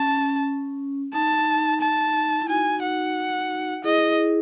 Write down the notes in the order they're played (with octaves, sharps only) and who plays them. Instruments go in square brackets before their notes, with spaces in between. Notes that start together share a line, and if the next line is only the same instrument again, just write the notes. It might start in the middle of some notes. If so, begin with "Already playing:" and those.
Already playing: [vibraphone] C#4 [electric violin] A5
[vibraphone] D#4 [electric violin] A5
[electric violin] A5
[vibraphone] E4
[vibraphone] D#4 F#4 [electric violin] G#5
[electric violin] F#5
[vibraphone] E4 G#4 [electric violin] D#5